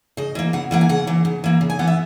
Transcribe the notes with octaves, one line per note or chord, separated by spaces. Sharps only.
C#3 D#5
E3 A#3
C#3 F#5
E3 A#3 F#5
G#5
C#3 F#5
E3 A#3
C#3
E3 A#3
C#3
G#5
E3 B3 F#5
E5